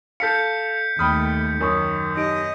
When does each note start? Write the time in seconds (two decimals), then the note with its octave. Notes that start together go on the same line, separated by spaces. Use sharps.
0.20 A4 F5 G6 B6 C#7
0.99 D#2 A3 G5 B5 D#6 F6
1.61 F#2 D#3 A#4 C#6 D#6
2.17 D#4 G4 D#5 D7